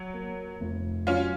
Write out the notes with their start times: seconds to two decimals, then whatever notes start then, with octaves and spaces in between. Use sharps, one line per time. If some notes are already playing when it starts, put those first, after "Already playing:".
Already playing: F#3
0.14 A#3
0.60 F1
1.07 F#3 C#4 F4